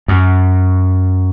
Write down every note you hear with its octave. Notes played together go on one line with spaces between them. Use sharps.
F#2